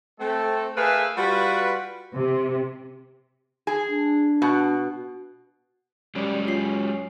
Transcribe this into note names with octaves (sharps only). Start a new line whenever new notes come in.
A3 C4 A4
A3 G#4 A#4 B4 E5 F5
G3 F4 F#4 B4
C3
G#4
D4
B2
F#2 G3 G#3 G4 C#5
C#4 F4 C7